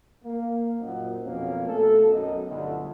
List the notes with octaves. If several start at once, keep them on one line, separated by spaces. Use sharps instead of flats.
A#3
F#2 A#2 D#4 C5 F#5
F2 B2 A#3 C#4
B2 A3 A4
B1 F#2 D#4 F#4 D#5
G1 D2